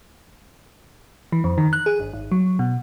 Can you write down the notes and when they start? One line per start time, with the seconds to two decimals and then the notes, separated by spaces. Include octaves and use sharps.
1.32 E3
1.44 F2
1.58 D#3
1.73 F#6
1.86 G#4
2.00 G1
2.14 G#1
2.32 F#3
2.59 B2